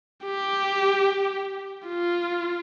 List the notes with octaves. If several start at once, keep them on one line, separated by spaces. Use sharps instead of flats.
G4
F4